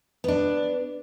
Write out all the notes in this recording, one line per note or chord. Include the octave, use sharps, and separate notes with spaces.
B3 D4